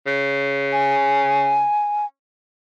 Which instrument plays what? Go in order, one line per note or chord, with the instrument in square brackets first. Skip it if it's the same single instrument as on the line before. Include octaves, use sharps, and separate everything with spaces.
[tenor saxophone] C#3
[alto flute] G#5